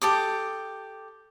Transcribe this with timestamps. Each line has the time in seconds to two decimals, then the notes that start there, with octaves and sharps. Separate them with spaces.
0.02 G4 A4 D6 D#6